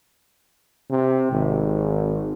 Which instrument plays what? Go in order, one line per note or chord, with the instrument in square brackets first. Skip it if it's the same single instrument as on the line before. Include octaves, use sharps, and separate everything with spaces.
[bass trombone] C3
G#1